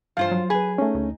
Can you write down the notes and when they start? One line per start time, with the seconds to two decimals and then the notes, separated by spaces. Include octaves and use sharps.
0.17 G2 E3 F3 F4 C5 F5
0.31 F#3
0.50 G#4 B4 G#5 B5
0.78 A3 C#4 D#4
0.95 D2